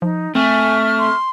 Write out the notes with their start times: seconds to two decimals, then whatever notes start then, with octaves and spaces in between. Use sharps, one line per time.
0.02 F3 D#4
0.35 A3 C4 E5 G#5 C#6 F6
0.99 C6